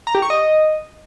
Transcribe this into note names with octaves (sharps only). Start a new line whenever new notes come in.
A#5
G4
C#6
D#5